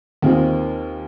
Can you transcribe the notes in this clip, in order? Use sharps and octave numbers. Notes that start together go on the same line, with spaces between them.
D#2 D#3 C4 F4 G#4